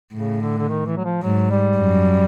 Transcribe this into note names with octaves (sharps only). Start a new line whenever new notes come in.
A2 C#3
D3
D3
D#3
E3
F#3
F3
G#2 F#3
G3
F#2